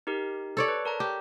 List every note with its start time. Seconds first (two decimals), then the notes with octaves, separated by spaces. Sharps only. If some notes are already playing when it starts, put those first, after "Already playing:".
0.07 D#4 G4 A#4
0.57 A4 C#5 D5
0.68 B4
0.85 A#4 A5 A#5
1.00 G4